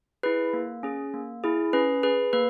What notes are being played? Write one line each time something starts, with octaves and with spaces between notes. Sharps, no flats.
E4 G#4 B4
A#3
C#4 G#4
A#3
E4 G#4
C#4 B4
G#4 B4
A#3 B4